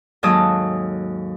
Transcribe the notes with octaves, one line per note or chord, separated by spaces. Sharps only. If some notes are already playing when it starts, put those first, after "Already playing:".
D#2 G#2 F#3 A4 D#5 D#6